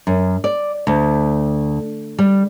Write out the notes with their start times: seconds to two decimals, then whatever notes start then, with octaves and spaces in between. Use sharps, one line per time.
0.07 F#2
0.44 D5
0.87 D2
2.19 G3